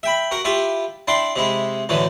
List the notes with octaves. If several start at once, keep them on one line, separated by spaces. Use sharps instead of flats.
E5 G5 B5
F#4 A#4
E4 F4 G4 E5
D4 E4 G5 C6
C3 G#3 E4
F#2 A2 D3 E3